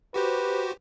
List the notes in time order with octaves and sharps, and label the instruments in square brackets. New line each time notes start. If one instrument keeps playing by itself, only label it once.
[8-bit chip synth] F#4 G4 C5 [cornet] B4